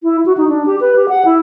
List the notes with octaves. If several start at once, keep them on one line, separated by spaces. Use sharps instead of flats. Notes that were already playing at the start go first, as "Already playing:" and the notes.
E4
F#4
D#4
D4
G4
B4
G4
F#5
E4